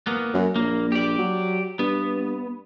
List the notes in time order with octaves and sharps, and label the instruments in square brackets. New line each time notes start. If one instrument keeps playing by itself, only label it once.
[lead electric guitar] A#3 B3
[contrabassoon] F#2
[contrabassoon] A#1 [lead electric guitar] A#3
[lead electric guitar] G4 D5
[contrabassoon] F#3
[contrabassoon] G2 [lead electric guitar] B3